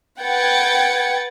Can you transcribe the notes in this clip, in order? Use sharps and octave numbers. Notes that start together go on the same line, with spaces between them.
B4 F#5 G5 G#6 A6 C#7